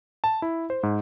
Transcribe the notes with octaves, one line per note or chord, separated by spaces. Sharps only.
A5
E4
C5
G#2